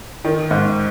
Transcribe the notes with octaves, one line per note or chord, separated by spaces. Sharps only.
D#3
G#2